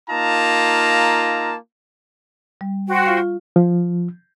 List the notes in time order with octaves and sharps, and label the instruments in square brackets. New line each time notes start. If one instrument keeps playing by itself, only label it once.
[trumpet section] A#3 D#4 F4 A5 A#5
[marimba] G3
[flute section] F#4 C5 G5
[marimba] F4 F5 C#6
F4
[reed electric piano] F3